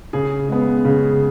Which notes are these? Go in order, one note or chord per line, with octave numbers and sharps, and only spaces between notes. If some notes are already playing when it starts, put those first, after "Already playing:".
C#3 G#4
G#3 B3
C#3